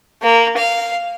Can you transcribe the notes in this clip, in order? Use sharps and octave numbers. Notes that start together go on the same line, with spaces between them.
A#3
F5